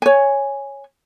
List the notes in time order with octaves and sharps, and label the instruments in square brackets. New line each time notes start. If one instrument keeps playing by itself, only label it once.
[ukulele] C#5 G#5